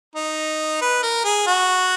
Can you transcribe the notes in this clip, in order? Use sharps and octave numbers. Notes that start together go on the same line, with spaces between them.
D#4
B4
A#4
G#4
F#4